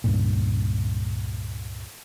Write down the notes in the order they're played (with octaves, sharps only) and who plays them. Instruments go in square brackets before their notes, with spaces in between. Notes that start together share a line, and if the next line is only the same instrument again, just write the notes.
[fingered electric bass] C#2 G2 A#2